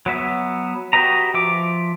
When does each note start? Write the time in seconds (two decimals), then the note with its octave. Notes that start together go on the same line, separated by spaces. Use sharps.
0.06 F#3 B3 E5
0.93 F#4 G4 B4 D#5 A#5
1.34 F3 E5 D6